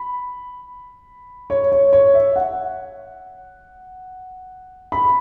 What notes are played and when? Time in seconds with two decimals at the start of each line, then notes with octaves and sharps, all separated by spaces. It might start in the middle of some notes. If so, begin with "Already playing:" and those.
Already playing: B5
1.50 C#5
1.72 C#5
1.93 C#5
2.14 E5
2.36 F#5
4.92 B5